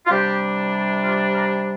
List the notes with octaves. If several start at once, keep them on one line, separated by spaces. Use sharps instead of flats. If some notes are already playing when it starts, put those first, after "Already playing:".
F4
C3 G3 D4 G4
F4
A#4